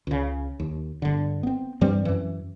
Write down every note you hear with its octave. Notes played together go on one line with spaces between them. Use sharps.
C#2 C#3
D#2
G1 D3
B3 C4
G2 E3 G3 C4
F#2 E3